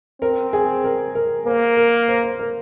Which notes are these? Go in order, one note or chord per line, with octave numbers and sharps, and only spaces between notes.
C4 A#4
G#4
A#4
A#4
A#3 C5
A#4
C5
C5
A#4